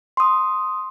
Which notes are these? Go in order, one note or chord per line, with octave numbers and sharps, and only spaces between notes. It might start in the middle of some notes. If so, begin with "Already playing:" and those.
C6 D#6